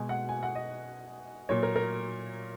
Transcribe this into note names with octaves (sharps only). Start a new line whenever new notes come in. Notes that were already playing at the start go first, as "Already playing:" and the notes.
Already playing: B2 G#3 G#5
F#5
G#5
F#5
D#5
A#2 F#3 C#5
A#4
A#4